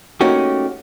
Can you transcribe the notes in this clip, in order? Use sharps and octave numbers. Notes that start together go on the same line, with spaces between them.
A3 A#3 C#4 D#4 F#4 G4